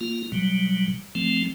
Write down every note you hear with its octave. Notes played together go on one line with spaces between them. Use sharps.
A#3 F4
B2 F#3 G3
F3 A3 C4